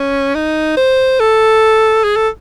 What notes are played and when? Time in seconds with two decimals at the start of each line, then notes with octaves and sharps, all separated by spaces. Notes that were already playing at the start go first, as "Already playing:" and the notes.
Already playing: C#4
0.35 D#4
0.77 C5
1.20 A4
2.04 G#4
2.16 A4